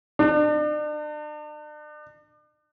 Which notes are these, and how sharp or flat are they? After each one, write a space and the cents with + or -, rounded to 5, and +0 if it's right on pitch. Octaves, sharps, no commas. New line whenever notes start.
D4 +40